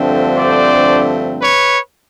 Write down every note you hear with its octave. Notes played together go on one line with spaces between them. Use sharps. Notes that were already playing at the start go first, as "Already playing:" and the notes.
Already playing: G2 D3 F3 A3 C4
C5 D5
B4 C#5